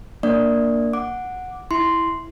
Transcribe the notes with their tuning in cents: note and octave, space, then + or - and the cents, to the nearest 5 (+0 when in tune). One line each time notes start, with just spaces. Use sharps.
A#3 +0 D4 +0 D5 +0
F#5 -10 D6 +0
E4 +0 C6 -5